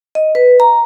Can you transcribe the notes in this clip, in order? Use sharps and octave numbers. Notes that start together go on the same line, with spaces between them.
D#5
B4
A#5